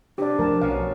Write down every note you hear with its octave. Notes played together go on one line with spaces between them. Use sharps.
C3 D4 G4 D5
F3 A3 A#4 A5
B1 B2 C#4 F#4 F5